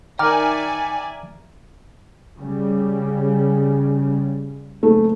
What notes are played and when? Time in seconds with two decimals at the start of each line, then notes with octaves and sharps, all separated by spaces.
0.19 D#3 D5 E5 G5 G#5 A#5 D6 F6
2.39 C#3 G3
4.83 F#1 A3